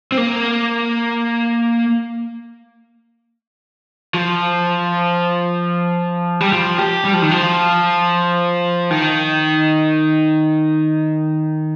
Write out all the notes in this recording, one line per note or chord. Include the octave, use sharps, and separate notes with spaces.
C4
A#3
F3
G3
F3
G4
G3
F3
D#3
F3
D#3